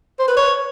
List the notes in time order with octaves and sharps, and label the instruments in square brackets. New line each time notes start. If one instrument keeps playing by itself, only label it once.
[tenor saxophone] C5
B4
C#5